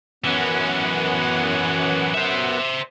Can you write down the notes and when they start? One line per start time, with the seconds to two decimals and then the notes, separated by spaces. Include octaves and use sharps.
0.24 F#2 E3 B3 C#4 F#5
2.14 C5 E5